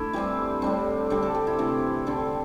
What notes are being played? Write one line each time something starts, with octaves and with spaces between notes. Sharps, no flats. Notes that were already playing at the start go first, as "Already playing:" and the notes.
Already playing: A3 D4 E4
E3 G3 C4 G4
A2 G3 C4 D4
D3 G3 C4 D5
A4
G4
E4
C3 E3 A3
D3 C4 A4